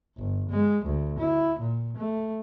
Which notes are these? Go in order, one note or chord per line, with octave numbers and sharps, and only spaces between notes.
G1
G#3
D2
E4
A#2
A3